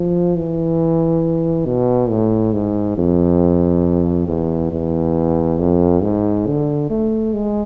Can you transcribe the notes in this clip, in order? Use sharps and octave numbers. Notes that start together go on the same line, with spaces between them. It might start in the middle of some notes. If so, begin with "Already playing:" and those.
Already playing: F3
E3
B2
A2
G#2
F2
E2
E2
F2
G#2
D3
A3
G#3